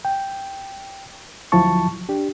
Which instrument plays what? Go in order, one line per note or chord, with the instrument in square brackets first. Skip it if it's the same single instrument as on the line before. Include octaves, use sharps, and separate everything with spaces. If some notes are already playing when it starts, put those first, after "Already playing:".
[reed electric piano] G5
D2 F3 F#3 E4 A5 C#6
D4 G4